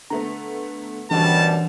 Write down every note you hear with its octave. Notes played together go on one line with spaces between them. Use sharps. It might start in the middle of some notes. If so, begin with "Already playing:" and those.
D3 A3 B3 A#5
F#2 B2 D3 E3 G3 C5 A5